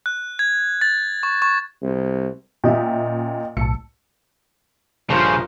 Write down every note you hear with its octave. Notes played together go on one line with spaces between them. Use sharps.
F#6
G#6
A6
C#6
C#6
C2
A#2 C#4 D#5 E5 G5
B1 A2 A5 E6 C#7
A#1 G2 C#3 F4 A#4 C5 A5